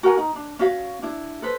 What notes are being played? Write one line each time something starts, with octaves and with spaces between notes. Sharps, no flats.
F#4 A#4 F#5 G#5
D#4
D4
C#4 F#4 F5
D4 E4
A4 B4 C5